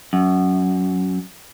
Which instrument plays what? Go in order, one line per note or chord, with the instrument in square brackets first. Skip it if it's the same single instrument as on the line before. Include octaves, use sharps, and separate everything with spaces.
[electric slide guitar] F#2